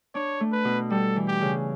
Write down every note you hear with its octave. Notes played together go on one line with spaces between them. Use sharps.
D4 C#5
A3
B4
B2
G3 A4
E3
G4
C#3